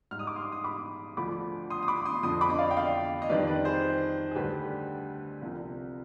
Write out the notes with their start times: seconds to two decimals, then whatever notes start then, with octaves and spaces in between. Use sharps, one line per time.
0.11 G#2 G3 F6
0.19 D#6
0.27 D6
0.36 C6 D#6
0.52 D#6
0.64 B5 D6
1.17 D2 D3 F3 B5 D6
1.70 C6 D#6
1.83 D#6
1.88 B5 D6
2.05 C6 D#6
2.23 F2 D3 F3 C6 D#6
2.41 B5 D6
2.50 D#5
2.58 D5 F5
2.71 G5
2.77 D5 F5
3.22 D#5
3.29 F2 D#3 G3 B4 D5
3.47 B4 D5
3.65 G#4 C5
4.31 G#4
4.36 D2 D3 G3 G4 B4
5.42 C2 C3 F3